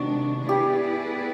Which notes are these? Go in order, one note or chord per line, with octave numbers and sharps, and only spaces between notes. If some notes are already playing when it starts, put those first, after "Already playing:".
Already playing: C3 D#3 G#3 B3 D4 F#4
B3 E4 G4 G#4 B4 D5